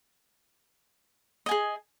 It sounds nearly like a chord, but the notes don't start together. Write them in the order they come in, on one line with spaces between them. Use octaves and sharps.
D#5 G#5 G#4